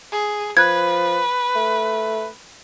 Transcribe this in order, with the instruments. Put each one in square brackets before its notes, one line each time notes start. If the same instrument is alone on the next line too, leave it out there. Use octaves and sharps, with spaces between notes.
[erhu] G#4
[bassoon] F3 [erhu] B4 [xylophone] F#6 G#6
[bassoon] A3